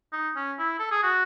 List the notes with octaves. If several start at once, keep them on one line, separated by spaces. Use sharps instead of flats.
D#4
C#4
E4
A4
G#4
F#4